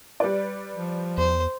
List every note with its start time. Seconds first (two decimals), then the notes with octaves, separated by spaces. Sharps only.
0.20 G3 B4 D5
0.74 F3
1.18 E2 C5